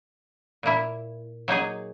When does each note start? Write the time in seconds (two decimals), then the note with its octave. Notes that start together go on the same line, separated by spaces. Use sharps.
0.63 A#2 A#3 E4
1.48 F#3 A#3 D#4 G#4